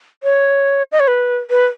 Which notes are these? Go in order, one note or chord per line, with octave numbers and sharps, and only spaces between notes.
C#5
D#5
C#5
B4
B4